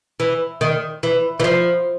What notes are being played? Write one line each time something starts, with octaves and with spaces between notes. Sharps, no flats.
E3
D#3
E3
E3
F3